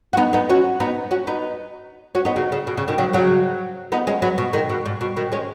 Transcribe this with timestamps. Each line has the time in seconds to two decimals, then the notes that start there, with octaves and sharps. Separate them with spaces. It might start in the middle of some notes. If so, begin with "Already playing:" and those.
0.13 F#4
0.17 B3 D#4
0.33 B3 D#4
0.49 C#4 F#4
0.80 B3 D#4
1.11 C#4 F#4
1.27 B3 D#4
2.15 C#4 F#4
2.25 B3 D#4
2.36 C#3 F#3
2.52 C#3
2.67 B2
2.77 C#3
2.88 B2 D#3
2.98 C#3 F#3
3.13 C#3 F#3
3.92 B3 D#4
4.07 G#3 C#4
4.22 F#3 B3
4.38 B2
4.53 D#3 G#3
4.69 B2
4.85 G#2
5.01 B2
5.16 B2 D#3
5.32 G#3 C#4